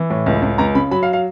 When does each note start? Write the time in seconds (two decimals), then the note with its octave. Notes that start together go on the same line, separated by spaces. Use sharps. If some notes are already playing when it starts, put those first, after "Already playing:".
Already playing: E3
0.10 A2
0.26 C#2
0.42 C#2
0.58 C#2 A#5
0.75 C#3 B5
0.91 F#3 B5
1.03 F5
1.13 F5